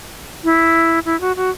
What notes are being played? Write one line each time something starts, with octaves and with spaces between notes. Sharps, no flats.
E4
E4
F#4
F#4